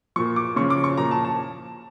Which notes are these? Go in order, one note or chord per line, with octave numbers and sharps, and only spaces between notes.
A#2 F3 C#6
D6
C#3 F3 C#6
D6
C#6
A#2 F3 A#5
A5
A5